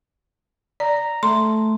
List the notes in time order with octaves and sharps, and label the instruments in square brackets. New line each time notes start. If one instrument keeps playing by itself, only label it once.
[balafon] D5 [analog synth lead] A#5
[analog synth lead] A3 [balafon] C6